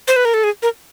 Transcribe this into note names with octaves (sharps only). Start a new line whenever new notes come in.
C5
B4
A#4
A4
G#4
A#4